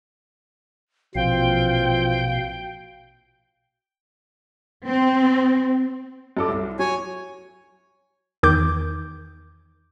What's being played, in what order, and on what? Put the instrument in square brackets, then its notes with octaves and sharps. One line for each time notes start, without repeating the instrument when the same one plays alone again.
[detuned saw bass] A#1 [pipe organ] B2 F5 [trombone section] E3 C4 F4 [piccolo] G5
[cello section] C4
[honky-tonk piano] F#2 A4 D6
C2
[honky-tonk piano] F#3 [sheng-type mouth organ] C#5 G#5
[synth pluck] E2 D#3 D6 G6